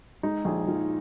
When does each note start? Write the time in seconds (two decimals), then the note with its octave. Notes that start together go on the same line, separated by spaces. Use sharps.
0.23 G#3 D#4
0.45 A#1 G#4
0.67 A#1 F4